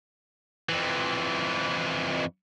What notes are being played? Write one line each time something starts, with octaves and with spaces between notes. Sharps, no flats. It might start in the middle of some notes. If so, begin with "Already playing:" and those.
F2 E3